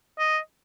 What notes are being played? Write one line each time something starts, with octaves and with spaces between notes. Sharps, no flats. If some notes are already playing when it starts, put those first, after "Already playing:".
D#5